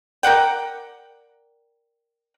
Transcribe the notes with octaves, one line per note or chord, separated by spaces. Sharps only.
A#4 D5 F#5 G5